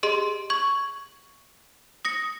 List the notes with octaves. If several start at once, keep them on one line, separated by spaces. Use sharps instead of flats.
G4 G#4 D#5 C6
C#6 G#6
D#6 A#6 C#7